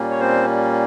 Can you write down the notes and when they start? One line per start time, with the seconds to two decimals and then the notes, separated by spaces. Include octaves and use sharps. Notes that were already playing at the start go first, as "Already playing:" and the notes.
Already playing: A#2 G3 A#3 C#4
0.11 C#5
0.20 C4 C5